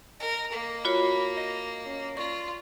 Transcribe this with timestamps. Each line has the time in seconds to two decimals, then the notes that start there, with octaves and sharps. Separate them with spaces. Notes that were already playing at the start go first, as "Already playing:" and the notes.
0.20 A#4 D#5
0.52 A#3
0.85 F4 F#4 C#5 B5
1.37 D#5
1.86 C#4
2.17 F4 D5 C#6